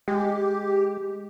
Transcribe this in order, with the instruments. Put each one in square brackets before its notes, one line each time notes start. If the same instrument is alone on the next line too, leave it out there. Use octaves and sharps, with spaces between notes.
[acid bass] G#3 [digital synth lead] G4